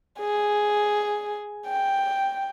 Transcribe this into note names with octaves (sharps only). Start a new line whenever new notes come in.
G#4
G5